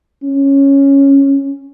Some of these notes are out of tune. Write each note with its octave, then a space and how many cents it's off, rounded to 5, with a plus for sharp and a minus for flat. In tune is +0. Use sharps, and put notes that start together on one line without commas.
C#4 -5